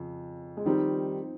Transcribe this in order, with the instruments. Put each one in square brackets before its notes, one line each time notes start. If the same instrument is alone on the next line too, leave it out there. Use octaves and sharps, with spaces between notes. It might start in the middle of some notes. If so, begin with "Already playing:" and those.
Already playing: [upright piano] F2 C#3
[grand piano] G#3
[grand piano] D#3 G3 [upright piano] F3 C4 D#4